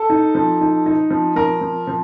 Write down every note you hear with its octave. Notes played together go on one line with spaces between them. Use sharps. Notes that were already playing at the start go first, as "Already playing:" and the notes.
Already playing: A4 A5
D#4
F3
D#4
D#4
F3
F3 A#4 A#5
F3
F3